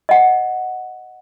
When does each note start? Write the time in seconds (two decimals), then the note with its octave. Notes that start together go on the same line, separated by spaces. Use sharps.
0.09 D#5 F#5